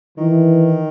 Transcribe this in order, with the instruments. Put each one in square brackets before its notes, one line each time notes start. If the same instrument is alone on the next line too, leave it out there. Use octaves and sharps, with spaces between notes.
[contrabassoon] D#3 [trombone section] E3